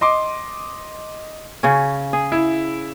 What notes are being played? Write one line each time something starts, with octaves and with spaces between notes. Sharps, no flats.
D#5 C6 D6
C#3 C#4
G#4
E4